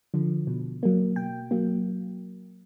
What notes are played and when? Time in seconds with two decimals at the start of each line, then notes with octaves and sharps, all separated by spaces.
0.14 D3 F3
0.47 B2
0.83 F#3 A#3
1.16 B2 G5
1.51 F#3 A#3